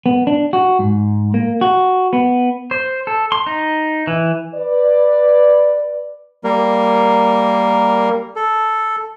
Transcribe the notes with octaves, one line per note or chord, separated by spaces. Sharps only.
B3
D4
F#4
G#2
A#3
F#4
B3
C5
A4
C6
D#4
E3
B4 D5
G3 A#3 A#4
A4